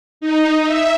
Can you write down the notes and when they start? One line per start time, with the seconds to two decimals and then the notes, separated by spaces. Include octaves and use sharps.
0.21 D#4
0.65 E5